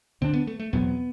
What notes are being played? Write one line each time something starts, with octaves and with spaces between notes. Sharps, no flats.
D2 D3 A3 C4 D4
B3
A3
A3
E2 B2 F#3 B3 C4